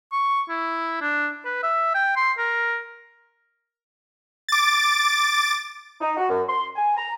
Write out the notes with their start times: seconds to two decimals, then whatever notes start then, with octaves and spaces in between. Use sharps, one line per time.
0.12 C#6
0.49 E4
1.01 D4
1.45 B4
1.63 E5
1.95 G5
2.16 C6
2.38 A#4
4.48 D6 A6
6.01 D#4
6.17 F#4
6.29 F#2
6.49 C6
6.76 G#5
6.97 A#5